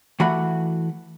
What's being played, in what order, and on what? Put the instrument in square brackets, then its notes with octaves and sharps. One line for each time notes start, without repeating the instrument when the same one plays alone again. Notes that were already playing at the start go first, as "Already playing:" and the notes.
[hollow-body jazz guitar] E3 A3 F#4 F#5 B5